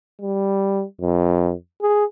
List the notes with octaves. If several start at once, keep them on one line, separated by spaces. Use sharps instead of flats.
G3
F2
G#4